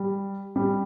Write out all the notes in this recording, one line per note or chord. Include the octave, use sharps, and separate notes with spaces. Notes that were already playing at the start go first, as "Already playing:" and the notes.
Already playing: G3
G3